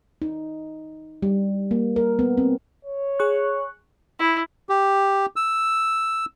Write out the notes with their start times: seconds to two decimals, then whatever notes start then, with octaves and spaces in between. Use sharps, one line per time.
0.22 D#4
1.22 G3
1.71 A#3
1.96 A#4
2.19 B3
2.38 C4
2.85 C#5
3.19 G#4 C#6 F#6
4.19 E4
4.69 G4
5.36 E6